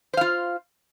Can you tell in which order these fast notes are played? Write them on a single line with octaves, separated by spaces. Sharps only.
C5 F5 F4